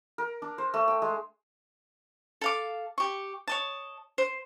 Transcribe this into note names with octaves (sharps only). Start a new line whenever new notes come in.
A#4
D4
C5
A3
G5
G#3
A4 F5 D6
G4 C#6
C#5 D#5 A5
C5